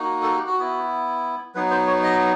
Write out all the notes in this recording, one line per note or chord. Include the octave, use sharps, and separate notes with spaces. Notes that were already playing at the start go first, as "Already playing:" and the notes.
Already playing: A#3 D#4 F#4
A4
G4
F#4
B3 E4
F#3 B3 D#4 B4
C5
C#5
D#5